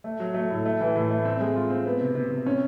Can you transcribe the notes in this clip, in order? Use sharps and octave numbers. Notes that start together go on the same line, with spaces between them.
A3
F#3
A3
A2
A3
E3
A2
A3
C4
G#3
F4
C4
B3
C3
C3
C3
C#4